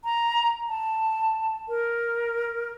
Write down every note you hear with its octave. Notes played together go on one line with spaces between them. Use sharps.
A#5
A5
A#4